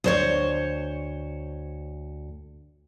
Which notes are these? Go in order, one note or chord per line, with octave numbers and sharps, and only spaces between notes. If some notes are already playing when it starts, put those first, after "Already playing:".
D2 C5 C#5